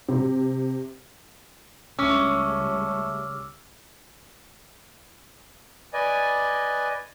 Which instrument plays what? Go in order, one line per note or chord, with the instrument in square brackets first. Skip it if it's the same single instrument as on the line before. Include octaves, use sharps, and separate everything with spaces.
[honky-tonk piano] C3
[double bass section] C#2 C#3 G3 [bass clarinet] A3 [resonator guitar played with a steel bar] C#4 [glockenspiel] D6 E6 F6
[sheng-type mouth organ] B4 D5 D#5 G#5